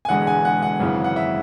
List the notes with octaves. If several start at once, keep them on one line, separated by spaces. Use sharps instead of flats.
G#5
E1 E2 D3 G#3 F#5
G#5
F#5
F#5
G#1 F#2 C#3 E3
F#5
E5